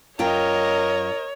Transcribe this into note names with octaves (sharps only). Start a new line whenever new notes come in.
F#2 F4 A#4 C#5 D#5 G5